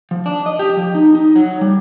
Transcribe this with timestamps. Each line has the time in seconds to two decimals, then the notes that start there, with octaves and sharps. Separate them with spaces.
0.11 F3
0.26 D4
0.46 D#5
0.59 G4
0.77 F3
0.95 D#4
1.15 D#4
1.36 F#3
1.61 G3